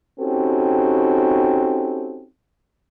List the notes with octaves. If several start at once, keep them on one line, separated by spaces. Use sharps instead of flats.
C4 C#4 D#4 F#4 G4 A4